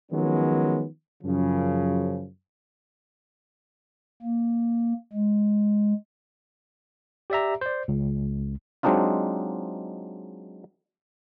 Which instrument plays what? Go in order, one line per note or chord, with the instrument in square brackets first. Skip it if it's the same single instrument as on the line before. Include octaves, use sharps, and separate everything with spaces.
[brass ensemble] D#3 F3 F#3 G#3 B3 C#4
F#2 C#3 F3
[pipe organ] A#3
G#3
[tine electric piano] G4 D5 E5 A#5
C5 D5
C#2
[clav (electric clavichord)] F#3 G#3 C4 D4 D#4 F4